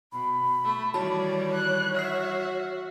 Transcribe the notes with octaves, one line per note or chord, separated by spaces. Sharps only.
B2 B5
A3
D#3 E3 G3 F#4 C#5 D5 A5 B5
F#6
F#4 E5 F6 C7